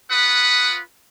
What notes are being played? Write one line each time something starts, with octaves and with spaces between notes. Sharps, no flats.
F4 B4 F#5 B5 D#6